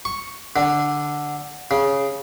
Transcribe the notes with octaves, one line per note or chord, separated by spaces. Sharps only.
C#6
D3
C#3